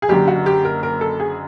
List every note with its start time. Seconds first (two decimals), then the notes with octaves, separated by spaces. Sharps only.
0.02 G#4
0.09 F#1 F#2 D3 G4
0.28 F#4
0.46 G4
0.65 A#4
0.83 A#4
1.01 A4
1.20 G#4